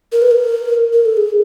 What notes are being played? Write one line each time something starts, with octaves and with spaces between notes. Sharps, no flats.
A#4
B4
A#4
A#4
A4
G#4